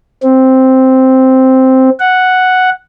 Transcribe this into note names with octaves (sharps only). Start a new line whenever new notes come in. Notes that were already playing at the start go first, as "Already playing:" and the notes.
C4
F#5